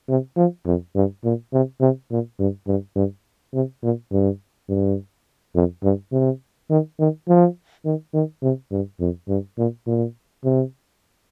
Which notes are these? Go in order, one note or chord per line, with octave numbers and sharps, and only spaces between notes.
C3
F3
F2
G2
A#2
C3
C3
A#2
G2
G2
G2
C3
A#2
G2
G2
F2
G2
C3
D#3
D#3
F3
D#3
D#3
C3
G2
F2
G2
A#2
A#2
C3